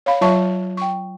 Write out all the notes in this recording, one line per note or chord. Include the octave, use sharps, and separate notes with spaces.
C#5 F5 B5
F#3 F4 C#5 E5 A5 C#6
G5 C#6